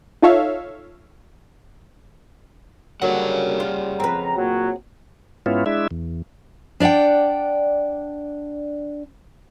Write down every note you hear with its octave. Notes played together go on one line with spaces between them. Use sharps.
D#4 F4 A4 C#5 E5 F5
D3 F#3 G3 A#3 G#4 C#5 F#5
F4
F2 C4 B4 A#5
A#2 F#3 F#4
G#2 B3 C#4 E4 F4
G#3 D4 E4 E5
E2
D4 D5 E5 F#5 G5